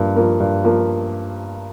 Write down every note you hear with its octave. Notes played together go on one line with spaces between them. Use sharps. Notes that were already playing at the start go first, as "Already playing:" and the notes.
Already playing: G2 F3 A#3
F3 A#3
G2
F3 A#3